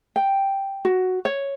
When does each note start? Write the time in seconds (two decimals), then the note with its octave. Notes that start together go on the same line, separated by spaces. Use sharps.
0.16 G5
0.85 F#4
1.25 C#5